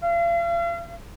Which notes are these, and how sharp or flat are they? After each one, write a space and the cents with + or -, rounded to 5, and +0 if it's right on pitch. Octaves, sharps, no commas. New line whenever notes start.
F5 -40